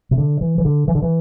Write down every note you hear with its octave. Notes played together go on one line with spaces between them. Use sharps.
C3
D3
E3
E3
D3
E3
D3
E3